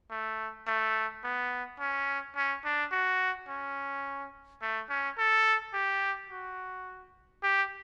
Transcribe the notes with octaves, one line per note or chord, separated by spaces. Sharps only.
A3
A3
B3
C#4
C#4
D4
F#4
C#4
A3
C#4
A4
G4
F#4
G4